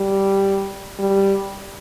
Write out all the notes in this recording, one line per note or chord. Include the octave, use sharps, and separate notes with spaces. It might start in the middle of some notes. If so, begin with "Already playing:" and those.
Already playing: G3
G3